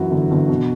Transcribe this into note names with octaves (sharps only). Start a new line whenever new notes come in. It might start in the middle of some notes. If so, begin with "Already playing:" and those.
Already playing: F#2 E3 F#4
G1
G1
B2